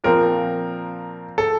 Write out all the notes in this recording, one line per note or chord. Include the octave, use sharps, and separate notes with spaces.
A#2 F3 C4 A#4
A4